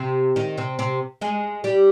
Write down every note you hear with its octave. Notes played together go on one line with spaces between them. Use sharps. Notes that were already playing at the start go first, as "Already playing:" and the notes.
Already playing: C3 C4
D#3 D#4
C3 C4
C3 C4
G#3 G#4
G3 G4